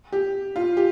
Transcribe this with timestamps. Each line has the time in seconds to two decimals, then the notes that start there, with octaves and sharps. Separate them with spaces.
0.12 G4
0.56 F4
0.77 G4